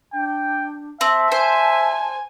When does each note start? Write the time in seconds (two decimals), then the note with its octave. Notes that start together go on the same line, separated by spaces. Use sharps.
0.13 D4 G5
1.01 C4 E5 A5
1.32 C5 G#5